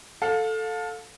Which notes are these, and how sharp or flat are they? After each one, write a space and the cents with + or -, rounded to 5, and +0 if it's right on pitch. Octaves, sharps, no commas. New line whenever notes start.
A4 +0 F5 +30